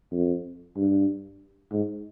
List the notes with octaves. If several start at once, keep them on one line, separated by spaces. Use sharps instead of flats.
F2
G2
G#2